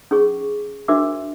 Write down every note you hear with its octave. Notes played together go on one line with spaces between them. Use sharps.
C#4 G#4 C#6
D4 F#4 A#4 C5 E5 D6